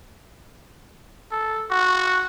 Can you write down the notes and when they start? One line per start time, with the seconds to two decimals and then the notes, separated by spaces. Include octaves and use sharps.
1.32 A4
1.71 F#4